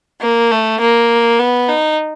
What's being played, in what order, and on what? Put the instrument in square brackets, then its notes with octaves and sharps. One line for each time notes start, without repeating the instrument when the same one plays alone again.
[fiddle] A#3
A3
A#3
B3
D#4